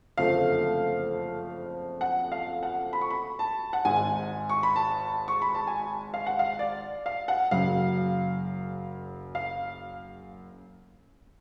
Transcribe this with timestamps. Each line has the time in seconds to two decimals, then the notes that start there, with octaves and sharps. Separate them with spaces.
0.18 F#1 F2 D3 F3 A3 F5
2.01 F#5
2.32 F5
2.63 F#5
2.93 B5
3.01 C#6
3.10 B5
3.39 A5
3.73 F#5
3.85 G#1 G#2 G#3 G#5
4.50 C#6
4.63 B5
4.76 A5
5.28 C#6
5.42 B5
5.55 A5
5.67 G#5
6.14 F5
6.26 F#5
6.39 F5
6.59 D5
7.06 F5
7.28 F#5
7.51 F#1 F#2 C#3 F#3 F5
9.35 F5